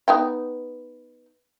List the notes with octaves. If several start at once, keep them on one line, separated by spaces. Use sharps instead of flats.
B3 D#4 G5